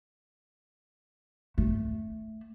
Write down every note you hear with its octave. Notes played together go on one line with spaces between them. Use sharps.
A3